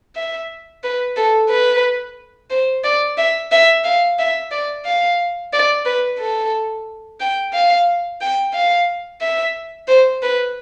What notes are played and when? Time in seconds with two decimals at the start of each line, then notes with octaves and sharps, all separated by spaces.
0.16 E5
0.84 B4
1.17 A4
1.50 B4
2.51 C5
2.84 D5
3.18 E5
3.52 E5
3.85 F5
4.19 E5
4.51 D5
4.86 F5
5.53 D5
5.86 B4
6.19 A4
7.20 G5
7.54 F5
8.21 G5
8.54 F5
9.21 E5
9.88 C5
10.23 B4